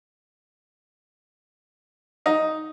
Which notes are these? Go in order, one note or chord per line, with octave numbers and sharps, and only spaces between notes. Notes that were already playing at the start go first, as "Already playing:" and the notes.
D#4